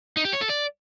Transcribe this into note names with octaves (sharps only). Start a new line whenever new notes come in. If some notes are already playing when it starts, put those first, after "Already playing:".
D#4
G4
C#5
A4
D5